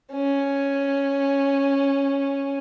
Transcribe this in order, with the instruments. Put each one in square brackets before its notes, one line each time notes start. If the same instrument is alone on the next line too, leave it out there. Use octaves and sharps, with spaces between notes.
[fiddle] C#4